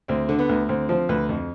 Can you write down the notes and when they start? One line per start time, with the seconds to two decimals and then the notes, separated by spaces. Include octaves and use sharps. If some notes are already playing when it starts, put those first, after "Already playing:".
0.08 D2 C4
0.29 D3
0.39 B3
0.49 D2
0.69 D2 C4
0.89 F3 C4
1.09 D2 B4
1.29 F2